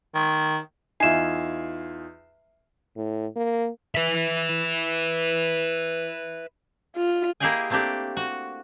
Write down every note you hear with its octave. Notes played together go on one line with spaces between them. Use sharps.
D#3
E2 D#4 F4 E5 G#5 C7 E7
A2
A#3
B4 E5
F4
A#3 E4 G4 G#4 D#5 G#5
A3 A#3 C4 D4 G4
F#4